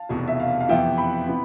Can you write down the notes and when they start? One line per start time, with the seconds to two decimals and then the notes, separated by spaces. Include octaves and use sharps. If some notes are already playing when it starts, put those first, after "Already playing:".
Already playing: F5 A5
0.09 F1 E2 B2
0.28 E5
0.40 F5
0.61 F5
0.69 F2 C3 E3 B3 E5 G5
0.98 G5 B5
1.28 C3 E3 B3